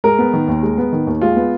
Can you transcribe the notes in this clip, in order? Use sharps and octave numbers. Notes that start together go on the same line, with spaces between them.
G#3 A#4
B3
D#3
D#2
G#3
B3
D#3
D#2
G#3 F4
B3